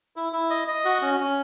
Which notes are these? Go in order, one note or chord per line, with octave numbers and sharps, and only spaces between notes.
E4
E4
D#5
D#5
F#4
C#4
C#4